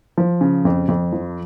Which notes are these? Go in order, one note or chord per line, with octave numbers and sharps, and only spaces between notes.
F3
C#3
F2
F2
F3